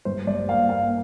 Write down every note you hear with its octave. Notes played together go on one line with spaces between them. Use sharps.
G2 C5
G2 D5
A#3 F5
A#3 F5